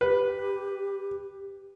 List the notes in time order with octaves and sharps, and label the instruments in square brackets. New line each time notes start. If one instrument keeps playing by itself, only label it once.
[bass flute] G4 [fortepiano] B4